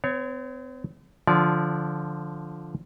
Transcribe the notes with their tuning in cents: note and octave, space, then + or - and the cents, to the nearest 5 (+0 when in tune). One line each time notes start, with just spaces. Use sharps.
C4 -45 C#5 +0
D3 +0 F3 +0 D5 -30